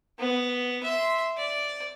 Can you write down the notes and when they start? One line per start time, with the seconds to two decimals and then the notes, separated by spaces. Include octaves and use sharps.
0.19 B3
0.83 E5 C6
1.37 D5